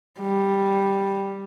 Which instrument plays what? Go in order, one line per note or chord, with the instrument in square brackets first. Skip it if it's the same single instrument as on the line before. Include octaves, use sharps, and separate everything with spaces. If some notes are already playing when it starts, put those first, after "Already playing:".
[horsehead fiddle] G3